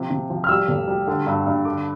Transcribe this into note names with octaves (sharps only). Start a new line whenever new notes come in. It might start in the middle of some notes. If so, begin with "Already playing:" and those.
Already playing: C3 F3
C3
F3
F6
G3 E6
F1
G3
D3
G2
G2
D3 D6